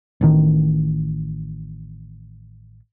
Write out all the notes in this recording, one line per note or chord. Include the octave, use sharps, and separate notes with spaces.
A1 A2 D#3